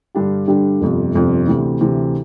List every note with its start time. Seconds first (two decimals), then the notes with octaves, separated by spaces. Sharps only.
0.15 G2 D3 G3 D4 G4
0.48 G2 D3 G3 D4 G4
0.81 G1 F2 C3
1.15 G1 F2 C3
1.47 D2 C3 E3
1.81 D2 C3 E3